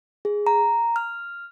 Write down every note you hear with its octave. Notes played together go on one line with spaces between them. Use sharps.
G#4
A#5
F6